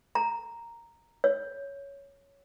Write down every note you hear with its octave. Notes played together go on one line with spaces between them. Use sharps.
A#5
C#5